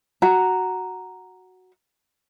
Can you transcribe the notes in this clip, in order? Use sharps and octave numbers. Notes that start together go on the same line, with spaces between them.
F#4 A#5